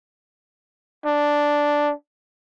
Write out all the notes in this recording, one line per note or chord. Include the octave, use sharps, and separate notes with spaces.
D4